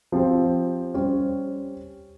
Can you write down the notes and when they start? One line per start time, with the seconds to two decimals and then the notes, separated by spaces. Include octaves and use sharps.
0.12 F3 C4 G4 C5
0.94 G3 C#4 G4 C5